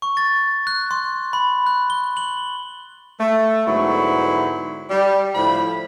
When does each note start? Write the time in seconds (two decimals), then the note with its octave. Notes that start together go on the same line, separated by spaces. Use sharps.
0.02 C#6
0.17 A6
0.67 F#6
0.91 C6
1.33 B5
1.66 F#6
1.90 G7
2.17 F#7
3.20 A3
3.67 G#2 D3 F#3 B3 E4 B5
4.90 G3
5.35 A2 D3 F3 E4 B5